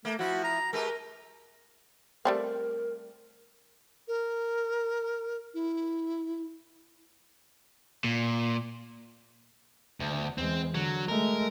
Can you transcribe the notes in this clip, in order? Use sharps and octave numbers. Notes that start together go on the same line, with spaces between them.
A3 A#3
F3 E4 F#4
A#5
G#3 G4 A#4 B4
G3 A3 C4 A#4
A#4
E4
A#2
D2
E2 G#3 C4
D3 F#3
G#3 A3 A#4